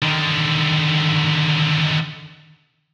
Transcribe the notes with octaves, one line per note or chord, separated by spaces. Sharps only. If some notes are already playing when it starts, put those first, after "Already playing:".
D3 D#3